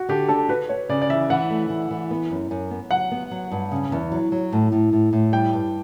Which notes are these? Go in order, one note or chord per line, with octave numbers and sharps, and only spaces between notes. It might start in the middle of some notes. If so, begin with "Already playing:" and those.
Already playing: F#4
D3 G4
D4 A4
F#4 B4
F#4 C#5
C#3 D5
D5
E3 E5
E3 F#5
A3
E3
E3
B3
F#2
F#2
B3
F#3 F#5
B3
F#3
G2
C#3
E2
F#3
F#3
A2
A2
A2
A2
G3 G5
G2